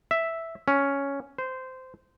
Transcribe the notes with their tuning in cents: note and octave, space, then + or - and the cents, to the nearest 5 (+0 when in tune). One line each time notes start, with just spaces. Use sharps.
E5 +0
C#4 +5
C5 -15